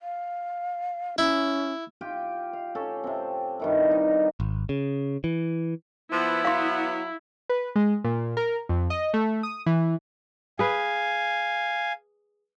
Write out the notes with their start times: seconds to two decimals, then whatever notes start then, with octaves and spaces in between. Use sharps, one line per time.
0.01 F5
1.18 C#4 E4
2.01 F4 G4 G5
2.53 F5
2.75 C#4 A4
3.04 C3 C4
3.60 G2 D#3 E4
3.91 D#4
4.40 G#1
4.69 C#3
5.24 E3
6.12 F3 B3 E4
6.45 F#3 F5 C6
7.49 B4
7.76 G#3
8.04 A#2
8.37 A#4
8.69 F2
8.90 D#5
9.14 A3
9.43 D#6
9.66 E3
10.59 G#4 B4 F5 G#5